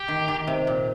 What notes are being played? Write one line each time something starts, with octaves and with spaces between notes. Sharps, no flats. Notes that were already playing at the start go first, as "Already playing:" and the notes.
Already playing: G4
D#3
D#3
C3
A#2